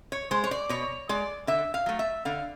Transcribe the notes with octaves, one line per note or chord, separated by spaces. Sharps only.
C#5
G#3 C5
C#5
D5
B2 C#5
G#3 D5
D3 E5
F5
F#3 A3
E5
D3 F5